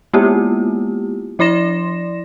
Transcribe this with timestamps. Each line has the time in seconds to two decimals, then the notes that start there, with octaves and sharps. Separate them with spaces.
0.13 G#3 A#3 B3 E4 F4 G4
1.39 F3 E4 D5 C6 A#6 E7